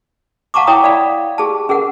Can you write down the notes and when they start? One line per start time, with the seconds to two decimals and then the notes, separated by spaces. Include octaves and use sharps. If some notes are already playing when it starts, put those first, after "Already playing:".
0.54 F5 F#5 A5 A#5 C#6 D6
0.67 E4 C#5 G5 A#5 D#6
0.84 D5 F5 B5
1.38 G4 G#4 A5
1.69 C#4 G#4 A#4 F#5